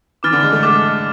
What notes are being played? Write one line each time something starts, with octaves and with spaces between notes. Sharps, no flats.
E3 D6 F6 A6
D3
G#3
A3
G#3 D6 F6 A6